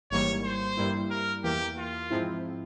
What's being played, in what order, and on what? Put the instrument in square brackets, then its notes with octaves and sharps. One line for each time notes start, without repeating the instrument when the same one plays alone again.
[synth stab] G#1 G#2 E3 G3 A#3 [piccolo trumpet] C#5
[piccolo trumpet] C5
[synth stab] G2 G3 A#3 E4
[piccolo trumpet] A#4
[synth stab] E2 E3 A#3 [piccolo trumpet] G4
[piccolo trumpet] F4
[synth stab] G#2 F3 C4 E4